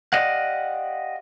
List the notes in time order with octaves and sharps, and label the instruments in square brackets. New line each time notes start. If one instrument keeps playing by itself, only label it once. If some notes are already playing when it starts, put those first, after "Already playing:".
[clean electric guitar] G4 D5 D#5 F5 F#5